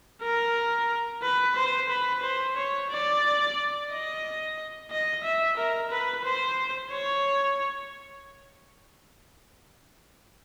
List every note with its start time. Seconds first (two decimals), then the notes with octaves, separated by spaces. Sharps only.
0.22 A#4
1.23 B4
1.56 C5
1.89 B4
2.23 C5
2.57 C#5
2.90 D5
3.90 D#5
4.91 D#5
5.24 E5
5.58 A#4
5.91 B4
6.24 C5
6.91 C#5